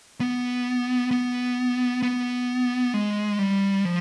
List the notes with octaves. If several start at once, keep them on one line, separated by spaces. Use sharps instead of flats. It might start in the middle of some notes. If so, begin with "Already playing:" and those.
B3
B3
B3
G#3
G3
F3